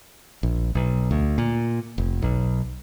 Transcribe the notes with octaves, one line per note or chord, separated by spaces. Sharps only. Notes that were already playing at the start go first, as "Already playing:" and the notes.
A#1
B1
D2
A#2
F1
B1